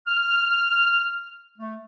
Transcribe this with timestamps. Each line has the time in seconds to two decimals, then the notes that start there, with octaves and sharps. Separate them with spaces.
0.07 F6
1.58 A3